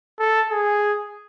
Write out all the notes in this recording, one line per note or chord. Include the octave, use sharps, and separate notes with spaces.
A4
G#4